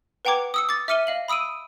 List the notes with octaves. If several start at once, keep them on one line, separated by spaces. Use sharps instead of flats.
B4 F#5 G5 A#5 D6 G#6
D#6 E6 C#7
D6 A6
E5 D6 F6 C#7 D#7 G7
D#5 F5 F#7
B5 D#6 E6 D7 D#7